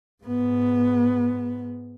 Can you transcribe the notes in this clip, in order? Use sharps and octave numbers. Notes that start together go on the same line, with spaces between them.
G#2 B3